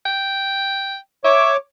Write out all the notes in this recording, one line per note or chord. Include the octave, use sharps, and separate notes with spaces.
G5
C#5 E5 D6